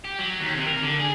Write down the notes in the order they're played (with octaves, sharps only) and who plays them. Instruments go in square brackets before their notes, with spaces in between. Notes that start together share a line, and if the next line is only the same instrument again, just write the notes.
[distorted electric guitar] G4
F#3
D#2
C3
A#4
D3
G#4